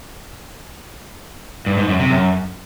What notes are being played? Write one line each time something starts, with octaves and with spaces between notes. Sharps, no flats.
G2
G#2
F#2
C3
F#2